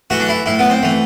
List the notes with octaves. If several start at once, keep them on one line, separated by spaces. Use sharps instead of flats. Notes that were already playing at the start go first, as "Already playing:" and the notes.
E3 A3 F#4
D4
E4
A2 E4
B3
C4
E3 A3